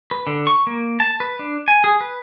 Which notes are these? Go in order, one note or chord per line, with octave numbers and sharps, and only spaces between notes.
B4
D3
C#6
A#3
A5
B4
D4
G#5
G#4
B4